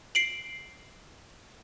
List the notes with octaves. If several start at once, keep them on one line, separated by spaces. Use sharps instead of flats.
C7 D7 F#7